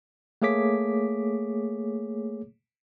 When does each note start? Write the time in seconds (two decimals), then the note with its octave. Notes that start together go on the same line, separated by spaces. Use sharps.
0.42 A3 A#3 G#4 C#5 D6 B6